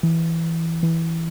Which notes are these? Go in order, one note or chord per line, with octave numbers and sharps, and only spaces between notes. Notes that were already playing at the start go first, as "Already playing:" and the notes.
E3
E3